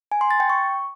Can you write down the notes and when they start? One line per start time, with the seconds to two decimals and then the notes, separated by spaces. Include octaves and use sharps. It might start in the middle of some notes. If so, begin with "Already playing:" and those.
0.12 G#5
0.21 C6
0.31 A6
0.40 G5
0.50 C#6